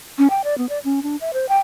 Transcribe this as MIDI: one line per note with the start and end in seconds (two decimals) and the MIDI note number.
0.18 0.27 61
0.30 0.42 79
0.44 0.57 74
0.58 0.69 59
0.69 0.79 74
0.84 1.03 61
1.03 1.16 62
1.21 1.31 76
1.34 1.48 72
1.49 1.57 79